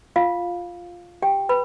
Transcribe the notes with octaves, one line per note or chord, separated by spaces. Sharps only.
F4 F5
G4 G5
B4 B5